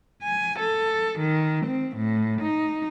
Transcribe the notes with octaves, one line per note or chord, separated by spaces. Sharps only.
G#5
A4
D#3
C4
A2
D#4